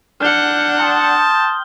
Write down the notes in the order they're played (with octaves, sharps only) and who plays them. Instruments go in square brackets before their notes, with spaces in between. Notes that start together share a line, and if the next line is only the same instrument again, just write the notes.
[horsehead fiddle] D4 F#5 [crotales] F6 G6 G7
[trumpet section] G5 C6 D#6 [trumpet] A5